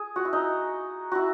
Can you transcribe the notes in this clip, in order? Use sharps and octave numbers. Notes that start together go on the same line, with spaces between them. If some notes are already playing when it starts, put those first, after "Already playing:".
Already playing: G#4
F#4
E4
D#4
E4 F#4